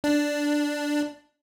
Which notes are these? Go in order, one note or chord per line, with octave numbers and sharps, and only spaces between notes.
D4